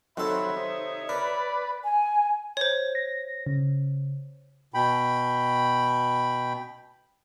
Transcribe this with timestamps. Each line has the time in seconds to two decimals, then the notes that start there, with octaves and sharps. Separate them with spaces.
0.17 C3 D#3 F#3 C4 A4 C#5 E5 B5
0.57 D#4 C5
1.09 A#4 B4 D5
1.84 G#5
2.57 C5 C#5
2.95 A#6
3.46 C#3
4.74 B2 G5 B5